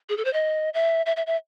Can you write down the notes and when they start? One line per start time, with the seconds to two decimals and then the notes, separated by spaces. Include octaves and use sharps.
0.09 G#4
0.17 A4
0.25 C5
0.33 D#5
0.74 E5
1.06 E5
1.17 E5
1.27 E5